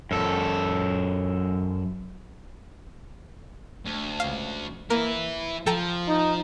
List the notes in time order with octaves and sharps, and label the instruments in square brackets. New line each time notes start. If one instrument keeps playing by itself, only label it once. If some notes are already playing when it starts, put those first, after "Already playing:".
[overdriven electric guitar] F#2 A4
[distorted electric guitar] D2
[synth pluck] C#2 F5
[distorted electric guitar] E3 E4 [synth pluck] A#3 A#4
[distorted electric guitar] F3 [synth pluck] A4 G5 A#5
[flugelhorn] D#4